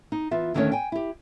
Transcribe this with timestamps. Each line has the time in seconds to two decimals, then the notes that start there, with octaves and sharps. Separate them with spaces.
0.12 D#4
0.31 E3 B3 F4 E5
0.54 D#2 D3 D#3 A3 C#4 C#5
0.72 G5 G#5
0.92 E4 G4